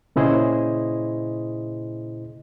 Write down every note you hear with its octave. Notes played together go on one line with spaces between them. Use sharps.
A#2 C#3 E4 G#4 C5 D#5